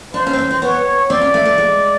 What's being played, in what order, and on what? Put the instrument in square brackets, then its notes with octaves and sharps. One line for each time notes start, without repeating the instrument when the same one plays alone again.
[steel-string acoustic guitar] D4 [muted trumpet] C5
[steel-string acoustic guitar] C#4
C4
C#4
C4
[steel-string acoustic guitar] B3 [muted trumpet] C#5
[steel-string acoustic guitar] C4 [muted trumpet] D5
[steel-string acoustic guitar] C#4
A3
A3
G#3